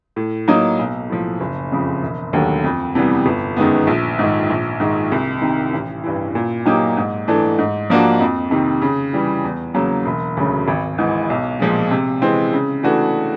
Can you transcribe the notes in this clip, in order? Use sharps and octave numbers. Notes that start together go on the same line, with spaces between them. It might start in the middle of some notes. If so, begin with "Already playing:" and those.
A2
F#3 A#3 D#4
B1
A2 F3
F#1
F2 C#3 F3
E1
D#2 D3 F#3 A3
F2
C3 E3 G3 B3
G1
F#2 D#3 G#3 B3
A#1
G#2 D#3
A#1
G#2 D#3 G#3
C2
C3 D#3
A1
G2 E3
A#2
F#3 A#3 D#4 G4
G#2
E3 A3 D4
G#2
F3 A#3 D4 F#4
F2
C3 D#3
C#3
E3 G3
E2
C#3 F#3 A#3
E1
D2 C#3 F#3
G#1
G#2 E3
B1
A#2 F3 G#3
C3
E3 G#3 C4
C#3
E3 A3 D4 F#4